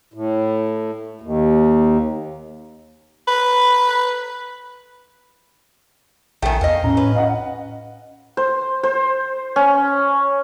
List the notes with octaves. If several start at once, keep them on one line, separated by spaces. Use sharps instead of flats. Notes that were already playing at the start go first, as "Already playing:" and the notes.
A2
D#2
B4
A#1 D#3 A3 G5 G#5
E2 D#5 F5
A2 C#4 A#5
B4
D#5 F5 F#5
C5
C5
C#4